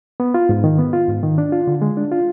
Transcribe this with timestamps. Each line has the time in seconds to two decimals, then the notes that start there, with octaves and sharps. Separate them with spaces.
0.20 B3
0.34 F4
0.49 G#2
0.64 D#3
0.79 B3
0.93 F4
1.08 G#2
1.23 D#3
1.38 D4
1.52 F4
1.67 D3
1.82 G#3
1.97 D4
2.12 F4